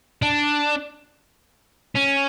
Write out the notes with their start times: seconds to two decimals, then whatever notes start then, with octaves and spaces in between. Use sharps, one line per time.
0.22 D4
1.96 C#4